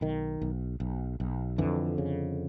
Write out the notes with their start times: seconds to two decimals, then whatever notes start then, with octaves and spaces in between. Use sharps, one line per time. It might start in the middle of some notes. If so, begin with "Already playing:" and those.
0.01 B1 D#3
0.42 B1
0.80 B1
1.20 B1
1.58 F2 D3 E3
1.98 C#3